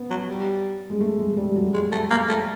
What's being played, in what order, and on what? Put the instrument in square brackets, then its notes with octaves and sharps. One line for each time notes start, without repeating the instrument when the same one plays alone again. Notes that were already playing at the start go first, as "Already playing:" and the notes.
Already playing: [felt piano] B3
[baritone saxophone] F#3
G3
[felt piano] G#3
A3
G#3
G#3
G3
F#3
[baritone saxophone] G#3
A3
A#3
A3